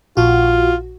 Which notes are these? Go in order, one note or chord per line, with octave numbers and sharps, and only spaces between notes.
A#1 F4 F#4